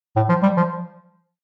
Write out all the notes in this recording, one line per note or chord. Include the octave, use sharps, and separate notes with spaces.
A2
F3
G3
F3